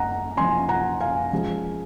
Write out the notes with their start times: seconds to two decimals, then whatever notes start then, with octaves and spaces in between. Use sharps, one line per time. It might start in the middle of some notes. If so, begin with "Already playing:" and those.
Already playing: F#1 F#2 F#5 A#5
0.37 F#1 F#2 F3 G#5 C6
0.69 F#5 A#5
1.00 F5 G#5
1.32 F#2 F3 G#3